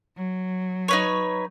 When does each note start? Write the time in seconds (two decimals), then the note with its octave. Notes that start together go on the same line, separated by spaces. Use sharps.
0.17 F#3
0.88 D#4 B4 C#5